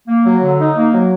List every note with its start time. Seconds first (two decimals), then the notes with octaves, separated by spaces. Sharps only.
0.08 A#3
0.25 F#3
0.42 D3
0.59 D#4
0.76 A#3
0.93 F#3